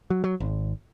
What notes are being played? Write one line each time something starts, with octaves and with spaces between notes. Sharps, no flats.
F#3
F#3
G#1